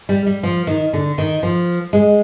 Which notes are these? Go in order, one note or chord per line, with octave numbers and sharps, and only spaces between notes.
G3
G3
F3
D#3
D3
D#3
F3
G#3